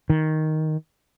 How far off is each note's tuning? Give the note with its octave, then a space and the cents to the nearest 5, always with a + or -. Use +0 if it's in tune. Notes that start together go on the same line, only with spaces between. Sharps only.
D#3 +5